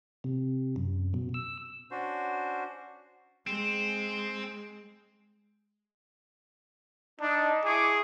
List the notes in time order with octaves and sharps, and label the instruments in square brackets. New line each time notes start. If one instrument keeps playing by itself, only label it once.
[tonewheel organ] C3
F#2
B2
E6
[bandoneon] C#4 D4 F#4 C5
[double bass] G#3 [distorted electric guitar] C4
[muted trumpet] D4 [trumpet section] D#4
[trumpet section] E4 C#6 D6 [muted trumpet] G#4